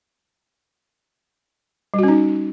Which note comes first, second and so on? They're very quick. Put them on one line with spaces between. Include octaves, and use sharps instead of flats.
G3 F#4 C#4 D#4